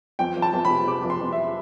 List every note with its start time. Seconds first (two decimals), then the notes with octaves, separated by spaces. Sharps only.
0.19 F2 G5
0.37 F2
0.42 A5
0.54 F2
0.65 B5
0.70 C3
0.87 C3 D6
1.04 F2
1.10 C6
1.21 F2
1.32 E5